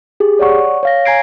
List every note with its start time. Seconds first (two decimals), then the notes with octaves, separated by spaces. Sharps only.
0.20 G4 G#4
0.39 C#5 D5 F#5 C#6
0.83 C#5 F5 A#6
1.06 G#5 A#5 G#6 C7 D7